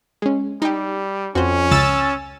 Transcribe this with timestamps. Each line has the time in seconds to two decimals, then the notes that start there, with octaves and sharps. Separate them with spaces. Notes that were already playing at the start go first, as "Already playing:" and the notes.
0.22 G#3 C#4
0.62 G3 D#4 G4
1.35 F2 C#4 F#4 C5
1.71 C#2 C#3 E6 A6